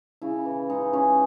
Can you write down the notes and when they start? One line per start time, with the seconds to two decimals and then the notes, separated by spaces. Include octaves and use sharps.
0.22 C#3 E4
0.45 E3
0.69 G#3 D#4
0.93 G#3 C#4